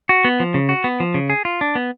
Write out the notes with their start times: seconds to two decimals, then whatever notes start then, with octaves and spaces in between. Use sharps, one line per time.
0.09 F#4
0.25 B3
0.40 F3
0.54 C#3
0.69 F#4
0.84 B3
1.00 F3
1.14 C#3
1.30 G#4
1.45 F4
1.61 D4
1.75 B3